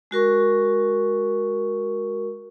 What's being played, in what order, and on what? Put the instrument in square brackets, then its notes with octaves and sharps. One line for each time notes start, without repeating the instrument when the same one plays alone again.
[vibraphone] G#3 F#4 A#4 C#6